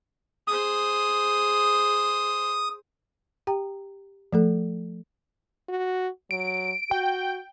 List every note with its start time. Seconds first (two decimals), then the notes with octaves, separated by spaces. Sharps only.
0.48 G#4 C5 D#6
3.47 G4 G5 A#5
4.33 F3 A3 A4
5.69 F#4
6.31 F#3 D7
6.91 F#4 G5